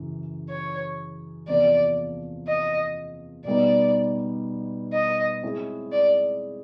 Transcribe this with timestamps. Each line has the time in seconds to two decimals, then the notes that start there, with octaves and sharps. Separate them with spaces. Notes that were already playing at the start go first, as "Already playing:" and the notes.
Already playing: F#2 C#3 E3
0.49 C#5
1.48 E2 C3 F3 A#3 D5
2.47 D#5
3.45 B2 G3 B3 D#4 D5
4.93 D#5
5.43 G#3 C4 E4 G#4 C#5
5.92 D5